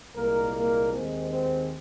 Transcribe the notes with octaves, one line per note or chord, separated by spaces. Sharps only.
C2 A#2 G#3 A#3 A#4
A#3 A#4
D#2 D#3 G#3 C4
C4